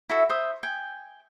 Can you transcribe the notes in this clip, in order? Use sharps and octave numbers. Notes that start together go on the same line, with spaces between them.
E4 F#4 A4 E5
C5 E5 D#6
G5 G#5